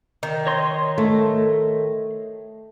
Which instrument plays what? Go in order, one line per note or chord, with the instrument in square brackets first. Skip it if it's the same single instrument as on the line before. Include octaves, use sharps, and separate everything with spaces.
[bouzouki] D#3
[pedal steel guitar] C#5 D#5 C6
[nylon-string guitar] A3